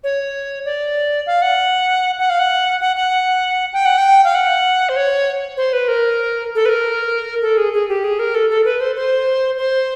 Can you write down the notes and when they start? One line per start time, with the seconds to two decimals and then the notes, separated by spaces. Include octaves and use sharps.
0.04 C#5
0.65 D5
1.27 F5
1.42 F#5
2.19 F#5
2.30 F5
2.39 F#5
2.81 F#5
2.96 F#5
3.73 G5
3.85 F#5
3.98 G5
4.24 F5
4.35 F#5
4.89 C5
4.96 C#5
5.57 C5
5.73 B4
5.88 A#4
6.55 A4
6.65 B4
6.69 A#4
7.42 A4
7.58 G#4
7.73 G#4
7.89 G4
8.04 G#4
8.19 A#4
8.35 A4
8.50 A4
8.65 B4
8.81 C5
8.96 C5
9.58 C5